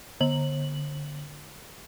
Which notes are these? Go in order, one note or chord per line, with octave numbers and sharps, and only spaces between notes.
D3 F#7